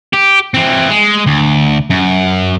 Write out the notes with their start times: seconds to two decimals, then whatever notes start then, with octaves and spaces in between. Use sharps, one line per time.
0.13 G4
0.54 E3 C4
0.90 G#3
1.26 D2
1.90 F#2